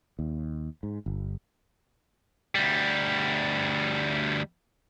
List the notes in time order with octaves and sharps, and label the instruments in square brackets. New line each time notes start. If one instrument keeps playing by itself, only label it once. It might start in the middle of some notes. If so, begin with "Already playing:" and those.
[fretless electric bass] D#2
G#2
G1
[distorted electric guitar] D2 G3